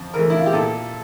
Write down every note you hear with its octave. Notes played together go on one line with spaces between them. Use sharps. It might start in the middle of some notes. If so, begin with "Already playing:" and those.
Already playing: F2
E3 A3 A#4
E4
F4
G4
A#2 A4